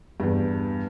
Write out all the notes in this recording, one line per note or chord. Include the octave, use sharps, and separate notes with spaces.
E2 G2